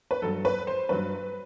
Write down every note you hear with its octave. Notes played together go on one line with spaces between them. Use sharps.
B4
G2 F#3 A4
B4
C5
G2 F#3 B4